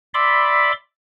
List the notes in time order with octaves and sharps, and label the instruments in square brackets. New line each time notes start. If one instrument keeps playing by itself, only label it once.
[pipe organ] D5 E5 B5 C6 D6